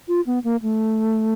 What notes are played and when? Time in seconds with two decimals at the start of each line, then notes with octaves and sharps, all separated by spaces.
0.08 F4
0.27 B3
0.44 A#3
0.62 A3